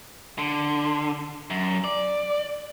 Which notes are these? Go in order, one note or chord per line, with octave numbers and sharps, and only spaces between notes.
D3
F#2
D5